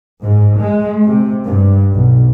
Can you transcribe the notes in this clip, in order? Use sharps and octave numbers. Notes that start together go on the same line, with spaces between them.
G#2
G#3
C3
G2
B1